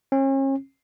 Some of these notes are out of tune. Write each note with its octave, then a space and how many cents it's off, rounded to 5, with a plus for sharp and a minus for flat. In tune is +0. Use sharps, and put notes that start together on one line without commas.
C#4 -40